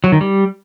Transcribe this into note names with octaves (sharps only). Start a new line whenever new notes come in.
F#3
D#3
G3